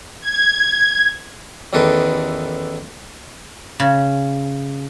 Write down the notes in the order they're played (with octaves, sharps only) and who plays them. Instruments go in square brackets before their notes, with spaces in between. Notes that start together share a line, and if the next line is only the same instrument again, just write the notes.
[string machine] G#6
[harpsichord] A1 E2 D#3 A4 B4
[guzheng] C#3